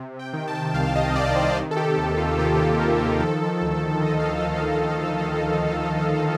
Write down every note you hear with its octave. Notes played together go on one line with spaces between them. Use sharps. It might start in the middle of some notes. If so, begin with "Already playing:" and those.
Already playing: C3
G5
D#3
A5
C2 F5
D#5
C3 D5
C5
D#3
A4
G4
D#2 G4
F4
A#3 G4
A4
D#3 A#4
A4
F3 A4
D2
F3 D#5
F5
D#5
D2
F5